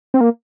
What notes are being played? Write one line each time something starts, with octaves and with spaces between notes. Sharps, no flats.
C4
A#3